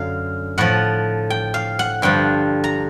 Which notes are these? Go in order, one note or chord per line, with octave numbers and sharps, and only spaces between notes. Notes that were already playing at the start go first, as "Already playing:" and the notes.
Already playing: F#2 D3 F#3 F5
A2 F3 F#5
G5
F5
F#5
G2 D3 F3 G5
A#5